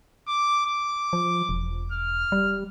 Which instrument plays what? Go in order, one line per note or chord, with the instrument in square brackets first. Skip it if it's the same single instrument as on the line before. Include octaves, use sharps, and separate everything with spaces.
[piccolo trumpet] D6
D6
[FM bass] F3
E1
[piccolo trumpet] F6
[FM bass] G3